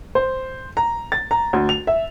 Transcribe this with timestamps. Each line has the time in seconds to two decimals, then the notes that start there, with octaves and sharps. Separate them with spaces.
0.15 C5
0.77 A#5
1.12 A6
1.31 A#5
1.53 D2
1.69 F7
1.87 E5